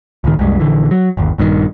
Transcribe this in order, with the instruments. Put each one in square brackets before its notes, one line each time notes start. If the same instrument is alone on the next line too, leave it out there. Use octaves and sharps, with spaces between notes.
[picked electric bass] C#2 A2 D#3
C2 F#2 G3 G#3
A#1 D3 E3
F#3
G1 D#2
A#1 G2 A#2 D#3